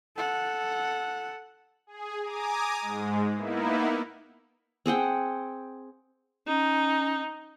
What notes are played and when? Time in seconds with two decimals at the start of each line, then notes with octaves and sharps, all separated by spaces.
0.17 A4 F#5
1.87 G#4
2.21 G#5 A#5 D6 D#6
2.81 G#2 G#3
3.36 A#3 B3 D#4 E4
4.86 C4 G#4 F#5 G5
6.47 C#4 D#4